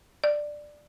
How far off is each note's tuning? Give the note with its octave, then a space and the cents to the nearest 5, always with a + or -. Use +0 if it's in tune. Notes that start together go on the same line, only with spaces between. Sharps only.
D5 +10